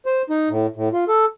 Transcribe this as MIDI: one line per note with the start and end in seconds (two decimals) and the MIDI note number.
0.06 0.22 72
0.30 0.49 63
0.50 0.67 45
0.76 0.89 45
0.93 1.04 65
1.08 1.25 69